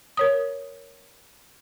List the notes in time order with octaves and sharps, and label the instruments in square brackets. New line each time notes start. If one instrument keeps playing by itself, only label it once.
[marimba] A#4 C#5 D#6